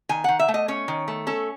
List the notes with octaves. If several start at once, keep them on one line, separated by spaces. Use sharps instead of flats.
D#3 G#5
D#3 F#5
E5
A3
D#5
C#4 C#5
D#3
A3
C#4 A4